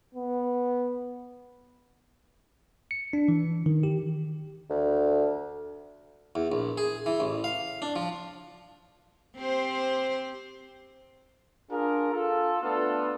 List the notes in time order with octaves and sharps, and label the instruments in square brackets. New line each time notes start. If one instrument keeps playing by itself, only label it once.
[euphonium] B3
[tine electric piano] C#7
D4
E3
D#3
G4
[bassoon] D2
[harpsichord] E2
A#1
G#4
E3
A1
F5
D4
F3
[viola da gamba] C4 G4 C5
[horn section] D4 F4 G#4 A#4
F4 A4
A3 B3 D4 F4 A4